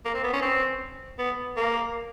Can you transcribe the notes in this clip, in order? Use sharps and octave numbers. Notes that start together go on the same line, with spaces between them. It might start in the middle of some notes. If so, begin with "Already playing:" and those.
A#3
C4
B3
C#4
C4
B3
A#3